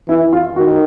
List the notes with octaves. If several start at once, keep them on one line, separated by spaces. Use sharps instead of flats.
E3 E4
F4
D#3 F#4